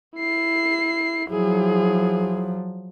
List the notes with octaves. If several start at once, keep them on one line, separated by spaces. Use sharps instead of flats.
E4 C7
F3 F#3 E4 G#4